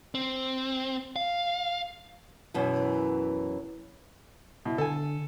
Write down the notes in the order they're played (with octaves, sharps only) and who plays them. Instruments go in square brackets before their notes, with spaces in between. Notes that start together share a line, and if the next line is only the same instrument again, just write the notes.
[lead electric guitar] C4
F5
[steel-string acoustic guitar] F#2 B2 E3
[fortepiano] B2 [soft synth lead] E4
[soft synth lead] D3 [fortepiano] A4 G#5